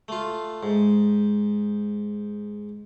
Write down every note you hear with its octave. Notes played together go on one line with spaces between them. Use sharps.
A3 F4
G#2